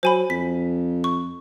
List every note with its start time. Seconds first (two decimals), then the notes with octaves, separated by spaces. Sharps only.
0.03 F#3 C5 G#5 B5
0.30 F2 B6
1.04 C#6